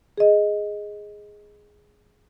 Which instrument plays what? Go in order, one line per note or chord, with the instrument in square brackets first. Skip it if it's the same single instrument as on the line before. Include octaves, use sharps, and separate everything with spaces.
[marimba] G#4 D#5